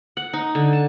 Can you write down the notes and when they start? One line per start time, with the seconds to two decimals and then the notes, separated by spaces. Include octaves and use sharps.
0.17 F#5
0.33 D#4
0.55 D3
0.73 A5